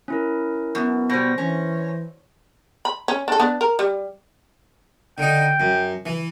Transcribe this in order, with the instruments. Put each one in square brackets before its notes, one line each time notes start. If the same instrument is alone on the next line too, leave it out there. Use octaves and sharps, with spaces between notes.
[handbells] C#4 E4 A#4
[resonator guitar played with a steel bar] F#2 [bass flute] B3
[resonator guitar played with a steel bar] B2 G3 [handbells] C5 A#6
[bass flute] E3 [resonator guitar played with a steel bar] C#4
[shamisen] B5
C#4
D4 A4
B3 D4
A#4
G3
[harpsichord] D3 D#4 [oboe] G5
[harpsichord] F#2
E3